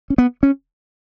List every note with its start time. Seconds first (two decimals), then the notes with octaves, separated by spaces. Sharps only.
0.10 C#4
0.18 B3
0.43 C#4